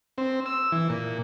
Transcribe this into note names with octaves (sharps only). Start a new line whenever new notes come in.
C4
E6
E3
A#2